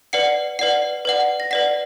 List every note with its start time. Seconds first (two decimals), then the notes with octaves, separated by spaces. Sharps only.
0.13 B4 D5 F#5 C#7
0.59 B4 D5 F#5 C7
1.05 B4 D5 F#5
1.40 A#6
1.51 B4 D5 F#5 B6